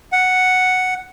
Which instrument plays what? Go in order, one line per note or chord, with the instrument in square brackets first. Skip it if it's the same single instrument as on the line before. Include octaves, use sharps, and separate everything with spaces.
[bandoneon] F#5